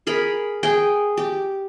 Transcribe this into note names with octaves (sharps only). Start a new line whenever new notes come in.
G#4 A#4 B5
G#4 G5
G4